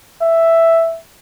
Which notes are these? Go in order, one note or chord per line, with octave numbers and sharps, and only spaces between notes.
E5